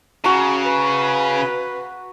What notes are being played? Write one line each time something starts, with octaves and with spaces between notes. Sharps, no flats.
C#3 F#4 A#5
B4